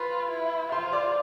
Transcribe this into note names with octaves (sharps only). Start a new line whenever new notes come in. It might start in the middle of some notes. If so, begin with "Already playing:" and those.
Already playing: F4 B4 B5
E4
F4 C5 C6
D5 D6